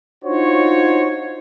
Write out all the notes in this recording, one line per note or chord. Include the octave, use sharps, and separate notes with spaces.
D4 D#4 F4 F#4 C5 C#5